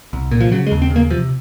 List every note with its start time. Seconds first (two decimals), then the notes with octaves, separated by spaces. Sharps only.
0.13 C2
0.31 A#2
0.40 F3
0.52 C#3 F#3
0.67 G#3
0.71 D#2
0.82 C4
0.90 C#3
0.96 A#3
1.10 C3 F3